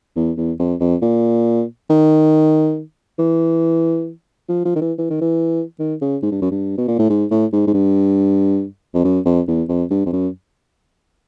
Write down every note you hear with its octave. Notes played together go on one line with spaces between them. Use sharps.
E2
E2
F2
F2
A#2
D#3
E3
F3
F3
D#3
E3
E3
D#3
E3
D#3
C#3
G#2
G2
F#2
G2
B2
A#2
A2
G#2
A2
G#2
G#2
G2
F2
F#2
F2
E2
F2
G2
F2
F#2